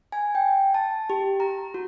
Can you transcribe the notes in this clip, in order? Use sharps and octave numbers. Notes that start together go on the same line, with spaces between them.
G#5
G5
A5
G4
A#5
F#4